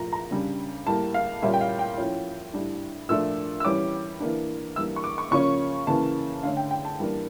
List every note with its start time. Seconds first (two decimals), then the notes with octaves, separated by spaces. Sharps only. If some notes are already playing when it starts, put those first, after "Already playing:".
Already playing: A#2 F3 A3 A#5
0.13 A#5
0.31 C#3 G3 D4
0.87 A2 G3 A#3 A5
1.14 F5
1.42 A#2 G3 C#4 E5
1.54 G5
1.61 F5
1.79 G5
1.98 A2 F3 C#4
2.54 A2 G3 D4
3.09 A#2 F3 A3 D4 E6
3.60 E6
3.65 E3 G3 C#4 D6
4.20 E3 A#3 D4
4.76 E3 G3 A#3 D4 E6
4.96 C#6
5.04 D6
5.18 C#6
5.31 C#3 F3 A#3 C#4 C#6
5.87 C#3 E3 A#3 A5
6.43 D3 A3 C#4 F5
6.57 G5
6.71 G5
6.85 A5
6.99 E3 G3 A#3 D4